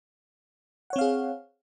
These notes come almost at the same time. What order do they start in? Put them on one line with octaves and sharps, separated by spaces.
F#5 C#5 C4 F5 G#4